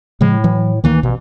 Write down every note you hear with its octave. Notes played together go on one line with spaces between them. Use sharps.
A2 C#3 F3 G#3
E3 F#3
D2 D#3 E3 A#3
A1 B2